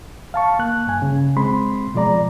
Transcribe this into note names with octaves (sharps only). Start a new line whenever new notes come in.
F5 A5 C#6
A#3 F#6
G2 G#5
C#3
G#3 C4 B5 C6
B2 F3 G#3 D5 A#5